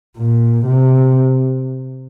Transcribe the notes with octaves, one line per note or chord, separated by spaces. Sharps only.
A#2
C3